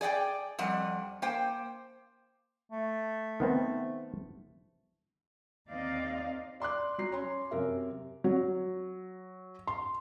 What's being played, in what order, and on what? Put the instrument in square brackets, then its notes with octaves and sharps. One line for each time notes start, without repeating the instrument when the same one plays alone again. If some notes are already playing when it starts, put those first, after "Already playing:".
[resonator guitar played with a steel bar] G#4 D5 F#5 G5
F2 G3 F#5
A#3 C5 G5
[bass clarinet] A3
[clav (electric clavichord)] D#3 B3 C4
[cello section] D#2 C4 D#4 D5 D#5 F5
[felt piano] D5 C6 D6 F#6
F#3 A#5 C7
C#4 C#5 C6
F#2 C3 A#4 E5
F#3
C6